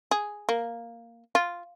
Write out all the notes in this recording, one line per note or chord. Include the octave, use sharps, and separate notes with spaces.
G#4
A#3
F4